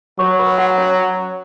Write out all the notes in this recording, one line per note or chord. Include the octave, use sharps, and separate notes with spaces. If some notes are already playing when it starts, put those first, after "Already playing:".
F#3 C#5 C#6
B4 B5
F#4 F#5
C#4 C#5